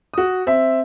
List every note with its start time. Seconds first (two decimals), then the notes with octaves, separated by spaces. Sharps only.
0.14 F#4 D#6
0.47 C4 E5